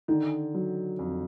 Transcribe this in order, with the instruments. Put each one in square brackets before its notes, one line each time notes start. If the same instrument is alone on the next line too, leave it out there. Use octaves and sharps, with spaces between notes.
[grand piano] D3 [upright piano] D#3
[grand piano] F#3
F2